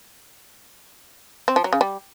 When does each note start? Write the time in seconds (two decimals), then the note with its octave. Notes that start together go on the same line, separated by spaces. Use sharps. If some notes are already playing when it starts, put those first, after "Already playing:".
1.48 C4
1.56 F3
1.64 F#3
1.73 C#3
1.81 G3